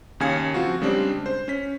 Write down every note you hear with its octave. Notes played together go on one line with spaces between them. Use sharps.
D#2 C#3 F5 G#5 G#6 C#7
F3 C4 F4 F#4
C#3 G3 G#3 C4 D4 G4
C5
C#4 B6